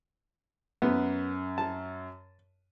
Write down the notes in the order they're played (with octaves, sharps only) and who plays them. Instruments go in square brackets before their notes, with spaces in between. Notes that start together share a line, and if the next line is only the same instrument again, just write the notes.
[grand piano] F#2 [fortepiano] B3
[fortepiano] A5